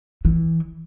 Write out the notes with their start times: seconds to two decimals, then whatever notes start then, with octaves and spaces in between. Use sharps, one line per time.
0.25 E3